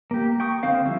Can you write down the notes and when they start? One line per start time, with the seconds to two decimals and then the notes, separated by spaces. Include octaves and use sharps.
0.11 A#3 G4
0.40 G5 C#6 D#6
0.63 D3 C4 C5 F5
0.85 F3 G3 E4